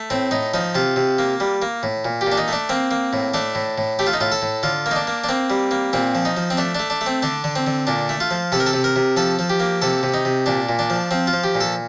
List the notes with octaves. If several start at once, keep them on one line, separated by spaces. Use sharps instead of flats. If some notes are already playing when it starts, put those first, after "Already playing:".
Already playing: A3
A2 C4
A2 D#4
F3 D#4
C3 F4
C3
A#3
G3
A#3
A2
A#2
G4
A#2
D4
D#4
A3 D4
A#3 C4
A#3
A2
A3 D4
A2
A2
A3 G4
F4
D#4
A2 F4
A4
A2
D3 F4
A#3
D#4
D4
A#3
D4
A#3 C4
G3
A#3
A#2 C4
F3
D#4
F3
C4
A3 D4
A3 D4
D4
A3
C4
D3 D4
D3
C4
D3
A#2 D4
A3
F4
F3
C3 A4
A#4
A4
C3
A#4
C3
F3 A4
F3
G4
A#3
C3 A4
C3
D#4
C3
A#2 D4
A#2
D4
F3
F3 C4
F4
F3
G4
A#2
A4